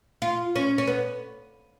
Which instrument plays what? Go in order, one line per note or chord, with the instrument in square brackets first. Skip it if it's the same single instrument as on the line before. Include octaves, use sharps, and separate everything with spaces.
[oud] F4
C#4
C#4
B3